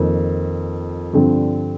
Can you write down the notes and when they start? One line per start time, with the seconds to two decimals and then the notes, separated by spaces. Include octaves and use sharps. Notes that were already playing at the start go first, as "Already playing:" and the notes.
Already playing: F2 D#3 A#3
1.13 G2 D3 F3 C4